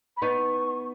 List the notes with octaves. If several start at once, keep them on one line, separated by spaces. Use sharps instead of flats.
B5
B3 D#4 C#6